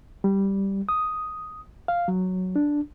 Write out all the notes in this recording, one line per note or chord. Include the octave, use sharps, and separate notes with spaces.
G3
D#6
F5
F#3
D4